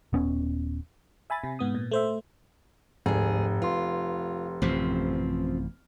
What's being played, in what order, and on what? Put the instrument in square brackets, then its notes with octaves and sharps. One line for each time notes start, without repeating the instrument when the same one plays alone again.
[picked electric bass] D#1 B3 C#4
[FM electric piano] E5 G#5 B5 A6
C3
G#2 B3 D#6
A#2
A3 C5 E5
[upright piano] F1 [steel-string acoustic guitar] D2 G#4 [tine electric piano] G#2
[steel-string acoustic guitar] F4 [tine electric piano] B4 C6
[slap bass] A1 F#2 C3 [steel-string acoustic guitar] F3 C4